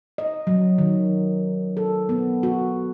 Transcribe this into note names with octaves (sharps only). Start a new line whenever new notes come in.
D#5
F#3
D#3
A4
B3
F#4